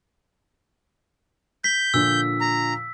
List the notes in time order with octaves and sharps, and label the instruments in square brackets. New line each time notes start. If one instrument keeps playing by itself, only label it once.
[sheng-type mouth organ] G6 [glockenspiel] B6
[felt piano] A#2 D3 F3 [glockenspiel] E6
[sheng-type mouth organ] A#5